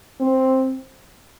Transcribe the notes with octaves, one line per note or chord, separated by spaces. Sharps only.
C4